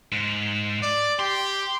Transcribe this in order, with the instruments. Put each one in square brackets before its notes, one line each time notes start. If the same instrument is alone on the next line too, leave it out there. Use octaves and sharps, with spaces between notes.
[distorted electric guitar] G#2
[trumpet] D5
[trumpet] G4 [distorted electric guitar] C6